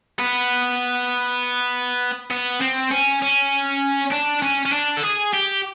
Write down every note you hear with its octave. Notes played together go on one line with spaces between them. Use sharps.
B3
B3
C4
C#4
C#4
D4
C#4
C#4
D4
A4
G#4
G4